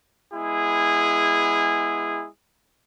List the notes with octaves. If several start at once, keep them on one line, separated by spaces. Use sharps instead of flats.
G#3 B3 E4 G#4